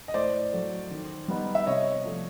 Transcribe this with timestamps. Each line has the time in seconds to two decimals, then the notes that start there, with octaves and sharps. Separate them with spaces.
0.08 D#5
0.14 A2 C5 D5
0.53 F#3 A3
0.91 D#3
1.28 G3 B3 D#4
1.55 E5
1.66 C3 C#5 D#5
2.05 F3 A3